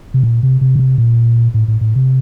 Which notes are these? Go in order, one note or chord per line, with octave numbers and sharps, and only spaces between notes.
C3
A#2
C3
C3
C#3
C3
A#2
A2
A2
A2
C3